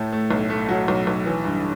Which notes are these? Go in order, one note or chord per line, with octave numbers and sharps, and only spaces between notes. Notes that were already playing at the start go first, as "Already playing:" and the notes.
Already playing: A2 A3
A3
B1
A3
F#3
B1
B1
E3
G2